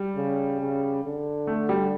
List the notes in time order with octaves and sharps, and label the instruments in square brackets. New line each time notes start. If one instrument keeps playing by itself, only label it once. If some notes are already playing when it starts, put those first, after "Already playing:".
Already playing: [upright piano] G3
[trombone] C#3
C#3
D3
[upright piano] A3
G3